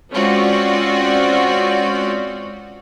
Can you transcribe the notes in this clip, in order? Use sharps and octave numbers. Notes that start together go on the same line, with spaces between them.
G#3 C4 C#4 F4 F#4 D5